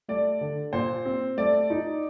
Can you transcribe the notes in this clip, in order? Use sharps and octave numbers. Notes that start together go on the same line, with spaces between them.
A3 D5
D3
A#2 C5
C4
A3 D5
D#4